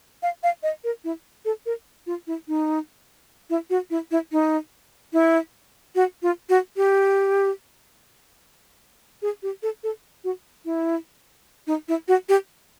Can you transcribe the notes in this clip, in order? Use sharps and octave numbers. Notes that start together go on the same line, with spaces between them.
F5
F5
D#5
A#4
E4
A4
A#4
F4
E4
D#4
E4
F#4
E4
E4
D#4
E4
F#4
F4
F#4
G4
G#4
G4
A4
A4
F#4
E4
D#4
E4
F#4
G4